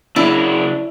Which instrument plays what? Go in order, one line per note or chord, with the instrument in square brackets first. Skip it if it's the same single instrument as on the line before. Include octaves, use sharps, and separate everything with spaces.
[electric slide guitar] C#3 F#3 A#3 [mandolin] D4 [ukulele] E4